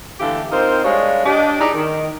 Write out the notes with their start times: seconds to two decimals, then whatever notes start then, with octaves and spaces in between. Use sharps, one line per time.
0.20 D3 E3 A3 G4 A4 F5
0.52 C4 D#4 F4 A#4 C5
0.84 G3 G#3 D4 C#5 F5
1.25 D4 G4 D#5
1.60 D#4 E4 G#4 D5
1.74 D#3